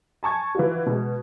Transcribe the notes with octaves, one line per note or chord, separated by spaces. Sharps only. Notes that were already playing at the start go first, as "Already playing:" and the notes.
G#5 A5 C#6 G#6
E3 F4 F#4
B2 G#3